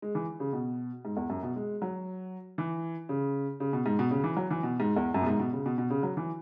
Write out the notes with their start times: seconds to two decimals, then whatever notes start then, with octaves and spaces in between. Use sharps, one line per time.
0.02 G#3
0.15 E3
0.40 C#3
0.53 B2
1.05 G#2
1.17 E2
1.30 F#2
1.43 B2
1.56 G#3
1.82 F#3
2.58 E3
3.09 C#3
3.60 C#3
3.73 B2
3.86 G#2
3.99 B2
4.11 C#3
4.24 E3
4.37 F#3
4.51 E3
4.63 B2
4.80 G#2
4.96 E2
5.14 F#2
5.22 B2
5.27 G#2
5.39 B2
5.53 C#3
5.66 B2
5.78 B2
5.90 C#3
6.03 F#3
6.17 E3